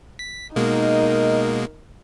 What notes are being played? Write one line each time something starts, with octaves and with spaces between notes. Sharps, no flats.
B6
B2 G#3 A#3 D#4 A#4 D#5